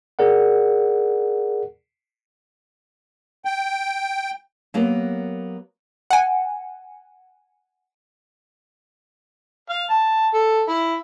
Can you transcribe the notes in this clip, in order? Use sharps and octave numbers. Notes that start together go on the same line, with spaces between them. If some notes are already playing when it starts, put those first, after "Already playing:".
G#4 A#4 D5 F#5
G5
F#3 A#3 B3 G4 A#4
F#5 G#5
F5
A5
A4
E4